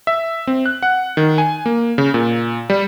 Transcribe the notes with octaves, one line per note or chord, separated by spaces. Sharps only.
E5
C4
F#6
F#5
D#3
G#5
A#3
C#3
A#2
G3